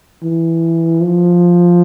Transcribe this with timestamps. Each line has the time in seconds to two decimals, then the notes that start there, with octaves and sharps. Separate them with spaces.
0.23 E3
1.02 F3